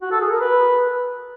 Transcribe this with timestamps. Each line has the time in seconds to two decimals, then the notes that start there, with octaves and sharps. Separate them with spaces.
0.01 F#4
0.11 A4
0.21 G#4
0.30 A#4
0.40 B4